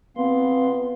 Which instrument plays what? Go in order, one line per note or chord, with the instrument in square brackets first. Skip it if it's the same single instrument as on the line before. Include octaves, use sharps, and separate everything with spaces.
[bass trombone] B3 [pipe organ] C4 F5 C6